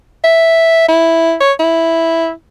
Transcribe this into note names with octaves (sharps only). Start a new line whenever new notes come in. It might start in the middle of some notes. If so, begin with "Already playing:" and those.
E5
E4
C#5
E4